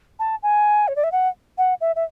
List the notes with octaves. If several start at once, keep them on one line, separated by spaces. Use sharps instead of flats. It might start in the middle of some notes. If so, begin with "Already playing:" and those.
A5
G#5
C#5
D5
E5
F#5
F#5
E5
E5